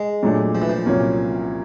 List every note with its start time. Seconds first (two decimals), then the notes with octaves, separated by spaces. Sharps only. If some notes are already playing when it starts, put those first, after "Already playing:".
Already playing: G#3
0.23 A#2 F#3 A3 D4
0.55 F3
0.62 E3
0.69 F3
0.86 C2 A#2 F#3 A#3 C#4